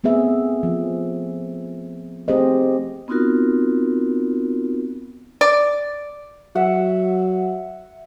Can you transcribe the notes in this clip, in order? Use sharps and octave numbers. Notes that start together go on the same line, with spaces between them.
A3 B3 C4 G#4 E5
F3
A3 C4 G4 G#4 C5 D#5
B3 C4 D#4 F4 F#4 A#4
D5
F#3 E5 F#5